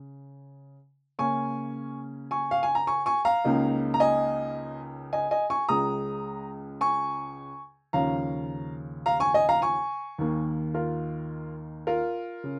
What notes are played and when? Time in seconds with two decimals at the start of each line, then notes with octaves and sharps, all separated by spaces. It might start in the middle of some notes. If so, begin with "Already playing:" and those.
Already playing: C#3
1.19 C#3 A#3 C#4 G#5 C#6
2.31 G#5 C#6
2.51 F5
2.63 G#5
2.75 A#5
2.87 G#5 C#6
3.06 G#5 C#6
3.25 F5 A#5
3.44 C#2 C#3 A#3 D#4
3.94 A#5
4.00 D#5 G#5
5.13 D#5 G#5
5.31 D#5 G#5
5.50 G#5 C#6
5.68 C#2 C#3 G#3 A#5 D#6
6.81 G#5 C#6
7.93 D#2 C#3 F3 C#4 F5 A#5
9.06 F5 A#5
9.20 G#5 C#6
9.34 D#5 G#5
9.49 F5 A#5
9.62 G#5 C#6
10.18 D#2 D#3 A#3
10.74 F4 A#4
11.87 F4 A#4
12.44 C#3